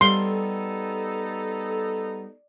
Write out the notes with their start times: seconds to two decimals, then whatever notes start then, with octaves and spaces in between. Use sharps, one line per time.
0.01 G3 B3 D#4 A4 C6